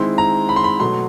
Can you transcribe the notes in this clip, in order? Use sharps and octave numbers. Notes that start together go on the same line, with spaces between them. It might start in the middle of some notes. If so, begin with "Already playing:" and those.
Already playing: D#3 G#3 C4 E4 C6
A#5
B5
C6
B5
B2 F#3 A3 C6